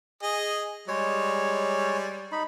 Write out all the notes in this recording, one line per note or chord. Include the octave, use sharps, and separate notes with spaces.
G#4 D#5
G3 G#3 C#5
D#4 B5